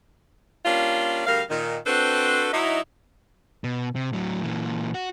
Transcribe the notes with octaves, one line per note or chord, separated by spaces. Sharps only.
G3 A#3 C#4 D4 F4
D2 G3 A#4 F5
A#2 D#3
C4 D4 F#4 A4 B4 C5
F#3 D#4 E4
B2
C3
A2 F#3
A#2 E3
F#4